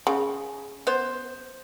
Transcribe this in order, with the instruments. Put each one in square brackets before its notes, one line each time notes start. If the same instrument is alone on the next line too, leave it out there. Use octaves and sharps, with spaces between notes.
[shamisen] C#3
[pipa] B3 C5